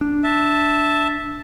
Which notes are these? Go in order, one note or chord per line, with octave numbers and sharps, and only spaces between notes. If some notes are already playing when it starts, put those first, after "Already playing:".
D4
E5 A5